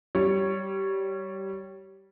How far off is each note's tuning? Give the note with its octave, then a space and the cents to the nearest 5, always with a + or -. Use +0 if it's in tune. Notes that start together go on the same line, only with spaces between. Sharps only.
G3 -15 C#5 +0